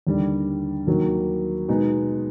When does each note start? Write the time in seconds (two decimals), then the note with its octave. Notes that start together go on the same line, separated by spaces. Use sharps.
0.07 D#2 D3 G3
0.87 D#2 D#3 F#3 A#3
1.68 B2 G#3 B3 D#4